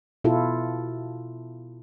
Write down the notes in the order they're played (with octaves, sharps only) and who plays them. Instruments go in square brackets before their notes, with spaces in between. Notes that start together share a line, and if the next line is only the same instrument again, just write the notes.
[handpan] B2 E4 F4 A4